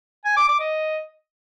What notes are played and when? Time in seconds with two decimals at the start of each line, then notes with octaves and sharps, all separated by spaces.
0.25 G#5
0.37 D6
0.48 D6
0.60 D#5